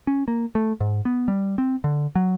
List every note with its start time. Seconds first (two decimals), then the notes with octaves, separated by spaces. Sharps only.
0.07 C#4
0.28 A#3
0.55 A3
0.80 G#2
1.05 B3
1.28 G3
1.58 C4
1.84 D3
2.15 F#3